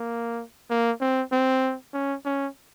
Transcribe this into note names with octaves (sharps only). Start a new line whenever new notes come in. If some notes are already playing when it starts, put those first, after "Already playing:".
Already playing: A#3
A#3
C4
C4
C#4
C#4